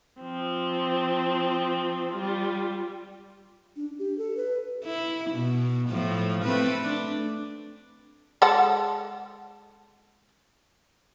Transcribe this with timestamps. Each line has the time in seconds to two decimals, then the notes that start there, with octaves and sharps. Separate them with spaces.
0.21 F3 C4
2.12 G3 F4
3.77 D4
3.99 G4
4.18 A4
4.37 B4
4.84 E4
5.30 B2
5.89 A2 F3
6.43 A3 C4 B4
6.83 D4
8.42 G#3 A4 F#5